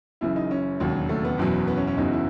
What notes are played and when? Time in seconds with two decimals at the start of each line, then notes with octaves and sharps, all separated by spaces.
0.21 F#1 F#2 C#3 E3 E4
0.36 D#4
0.51 C#4
0.80 E1 D#2 C#3 F#3
1.09 A3
1.25 B3
1.38 F#1 E2 B2 F#3
1.67 B3
1.77 C#4
1.87 C#4
1.97 F#1 E2 C#3 F#3 D#4
2.12 E4